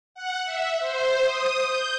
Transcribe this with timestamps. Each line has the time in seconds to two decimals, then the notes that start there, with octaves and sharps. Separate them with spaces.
0.15 F#5
0.45 E5
0.79 C5
1.22 D#6
1.62 G6